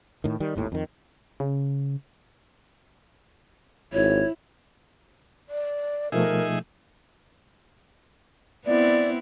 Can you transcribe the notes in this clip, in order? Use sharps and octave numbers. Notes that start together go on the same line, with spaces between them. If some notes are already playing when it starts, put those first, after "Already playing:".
A2 D#3
D#3 G3
G#1 D#2 A2
F2 D#3
C#3
G#1 E4 C#5
D5
B2 F3 A3 D#4 G#4 A#4 E5
B3 C4 E4 D5